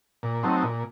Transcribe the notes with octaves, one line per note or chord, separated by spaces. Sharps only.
A#2
F#3 A3 C4 D#4
A#2